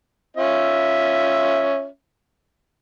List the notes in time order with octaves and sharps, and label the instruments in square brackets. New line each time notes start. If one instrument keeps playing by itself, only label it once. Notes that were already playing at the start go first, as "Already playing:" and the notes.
[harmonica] C#4 F4 E5